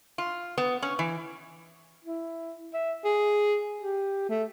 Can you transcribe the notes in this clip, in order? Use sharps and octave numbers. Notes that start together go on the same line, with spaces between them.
F4
B3
C#4
E3
E4
E5
G#4
G4
A3